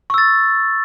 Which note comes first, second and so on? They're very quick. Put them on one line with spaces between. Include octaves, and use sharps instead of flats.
C#6 E6 A6